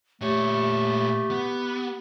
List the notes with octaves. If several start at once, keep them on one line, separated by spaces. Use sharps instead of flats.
A#2 A3 G4 C#5
B3